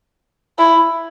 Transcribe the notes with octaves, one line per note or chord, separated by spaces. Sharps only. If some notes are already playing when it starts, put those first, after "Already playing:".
E4